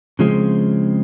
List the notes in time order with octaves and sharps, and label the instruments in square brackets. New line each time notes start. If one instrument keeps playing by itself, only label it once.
[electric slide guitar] C#3 F3 G#3 C4